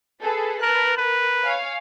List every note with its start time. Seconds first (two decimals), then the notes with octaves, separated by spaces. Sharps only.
0.23 G#4 A4 B4
0.62 A#4 B4 A5 F#6
0.98 A#4 B4
1.45 C#5 F5 G#5